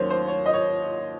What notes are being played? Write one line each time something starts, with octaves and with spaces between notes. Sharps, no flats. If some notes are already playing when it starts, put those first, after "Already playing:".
Already playing: D#2 D#3 F#3 C#4 C5 C#5
C5
C#5
D#5
C#5